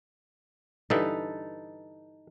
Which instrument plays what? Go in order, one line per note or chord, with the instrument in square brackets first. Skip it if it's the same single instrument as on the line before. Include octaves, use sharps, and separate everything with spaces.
[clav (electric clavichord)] G2 D3 E3 [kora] D#4 A4 B4